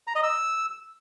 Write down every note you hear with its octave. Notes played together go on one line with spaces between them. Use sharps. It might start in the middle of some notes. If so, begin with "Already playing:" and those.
A#5
D#5
E6